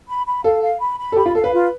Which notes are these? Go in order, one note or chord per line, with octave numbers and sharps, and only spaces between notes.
B5
B5
A4 F5
F5
B5
B5
A4
G4 B5
F4
A4 F5
B4
F4